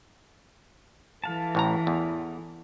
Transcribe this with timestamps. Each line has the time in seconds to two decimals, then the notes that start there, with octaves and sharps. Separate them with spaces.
1.24 E3 A4 F5 A5
1.55 A1 A2 A#5
1.87 E2